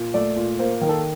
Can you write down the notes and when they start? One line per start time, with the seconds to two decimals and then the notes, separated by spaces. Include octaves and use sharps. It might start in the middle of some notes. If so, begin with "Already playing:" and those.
Already playing: A#2
0.14 A3 D5
0.36 A#2
0.59 A#3 C5
0.81 D#3 A#4
0.89 A4